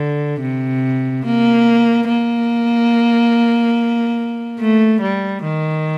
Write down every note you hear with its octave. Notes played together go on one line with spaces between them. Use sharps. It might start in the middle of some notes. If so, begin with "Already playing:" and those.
Already playing: D3
C3
A#3
A#3
A3
G3
D#3